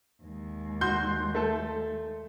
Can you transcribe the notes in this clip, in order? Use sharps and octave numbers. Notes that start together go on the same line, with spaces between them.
D#2 G#3
F#4 C6 G6
A3 A4